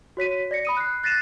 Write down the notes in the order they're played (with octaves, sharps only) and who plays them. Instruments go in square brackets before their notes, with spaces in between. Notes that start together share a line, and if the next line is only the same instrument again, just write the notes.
[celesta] F#4 C#5 B6 D#7
D5 A#6 C#7
B5 D#6 D#7
F#6 C7
F#6 A6 A#6 C7 D#7 E7